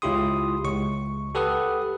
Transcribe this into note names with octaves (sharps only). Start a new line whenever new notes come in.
C#2 E4 F4 G4 C6 D#6
C#2 C#6
G4 A4 B4 F#5 D#6